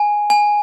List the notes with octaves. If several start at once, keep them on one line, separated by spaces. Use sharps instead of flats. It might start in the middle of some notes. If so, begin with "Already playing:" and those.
Already playing: G#5
G#5